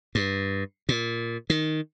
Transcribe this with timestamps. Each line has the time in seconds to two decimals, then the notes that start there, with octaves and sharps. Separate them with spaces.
0.15 G2
0.89 A#2
1.50 D#3